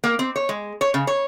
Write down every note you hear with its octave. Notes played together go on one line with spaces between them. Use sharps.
A#3
C4
C#5
G#3
C#5
C#3
C#5